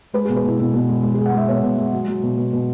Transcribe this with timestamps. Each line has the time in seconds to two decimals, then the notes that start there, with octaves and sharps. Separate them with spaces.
0.14 G#3 B4
0.25 B2 G#4
0.36 B4
0.44 B2 E4
0.59 B2 E4
0.74 B2
0.89 G#3
1.03 G#3
1.14 G#3 G#4
1.26 F#5
1.33 G#3 E5
1.48 B2 C#5
1.63 B2
1.78 G#3
1.93 F#3
2.08 F#3
2.23 B2
2.37 B2
2.53 B2